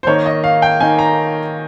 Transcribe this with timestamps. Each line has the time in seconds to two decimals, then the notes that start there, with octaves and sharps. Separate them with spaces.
0.03 C5
0.07 D#3 A#3 D#4 C#5
0.26 D#5
0.44 F5
0.62 G5
0.80 D#3 A#3 D#4 G#5
0.99 A#5